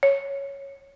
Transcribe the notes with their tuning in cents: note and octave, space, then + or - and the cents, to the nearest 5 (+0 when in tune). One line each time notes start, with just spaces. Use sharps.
C#5 +0